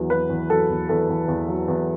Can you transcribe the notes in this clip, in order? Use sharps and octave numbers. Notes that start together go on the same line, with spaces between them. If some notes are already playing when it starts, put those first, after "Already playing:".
Already playing: E2 F#3
F#3 B4
E2
F#3 A4
E2
E2 A4
E2
E2
F#3
E2